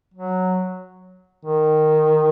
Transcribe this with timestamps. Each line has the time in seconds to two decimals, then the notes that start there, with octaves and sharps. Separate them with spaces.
0.14 F#3
1.45 D#3